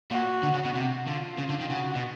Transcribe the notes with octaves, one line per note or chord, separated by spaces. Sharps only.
A#2 F#4
D3
C#3
B2
C3
D3 F4
C#3
D3
D#3
C#3 F#4
B2